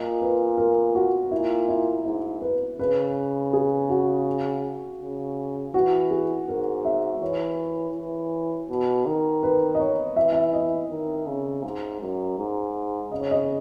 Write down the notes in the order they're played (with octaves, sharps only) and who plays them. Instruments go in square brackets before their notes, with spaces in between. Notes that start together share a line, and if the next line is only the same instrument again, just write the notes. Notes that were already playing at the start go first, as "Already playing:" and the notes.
Already playing: [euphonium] A#2 [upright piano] D#5
[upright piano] B4
A#4
F#4
[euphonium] A#2 [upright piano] E4
[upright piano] E4
[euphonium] G#2 [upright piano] E4
[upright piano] B4
[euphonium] C#3 [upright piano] B4
[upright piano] G#4
F#4
[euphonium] C#3
[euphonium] E3 [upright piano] F#4
[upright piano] G#4
[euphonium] G#2 [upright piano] A#4
[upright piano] E5
[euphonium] E3 [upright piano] C#5
[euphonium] E3
B2
D#3
[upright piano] B4
D#5
C#5
[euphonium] E3 [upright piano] E5
[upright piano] E5
D#5
[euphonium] D#3
C#3
G#2
F#2
G#2
[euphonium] C#3 [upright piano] D#5
[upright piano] C#5
D#5